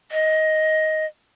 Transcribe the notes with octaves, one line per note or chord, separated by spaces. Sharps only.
D#5